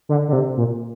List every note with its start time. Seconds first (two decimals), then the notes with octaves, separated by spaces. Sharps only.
0.09 D3
0.28 D3
0.33 C3
0.57 A#2